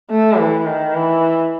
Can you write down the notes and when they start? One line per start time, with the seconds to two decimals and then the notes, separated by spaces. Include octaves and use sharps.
0.11 A3
0.38 E3
0.67 D#3
0.95 E3